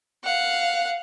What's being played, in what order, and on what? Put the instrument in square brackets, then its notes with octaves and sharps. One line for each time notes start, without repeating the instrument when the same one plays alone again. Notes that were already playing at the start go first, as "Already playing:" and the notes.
[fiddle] F5 F#5